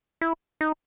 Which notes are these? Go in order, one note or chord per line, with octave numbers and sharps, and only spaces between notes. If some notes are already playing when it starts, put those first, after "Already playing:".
E4
D#4